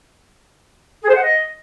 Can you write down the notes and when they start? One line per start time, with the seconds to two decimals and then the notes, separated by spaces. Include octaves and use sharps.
1.01 G#4
1.08 C5
1.15 F#5
1.22 D#5